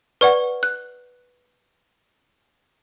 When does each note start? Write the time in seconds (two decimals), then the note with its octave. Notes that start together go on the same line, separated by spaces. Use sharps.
0.21 B4 D5 F#5 C#6
0.63 F#6